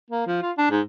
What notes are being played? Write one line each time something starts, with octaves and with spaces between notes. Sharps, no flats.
A#3
F3
F4
D4
G#2